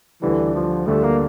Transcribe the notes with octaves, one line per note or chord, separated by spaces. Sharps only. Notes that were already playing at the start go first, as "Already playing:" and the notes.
D2 D3 E3 G3
F3
D2 D3 G3 A3
A#3